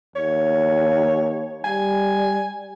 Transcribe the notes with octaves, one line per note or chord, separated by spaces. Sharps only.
D#2 C#5
G3 G#5